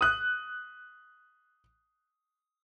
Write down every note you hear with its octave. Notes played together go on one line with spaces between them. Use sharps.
D#6 F#6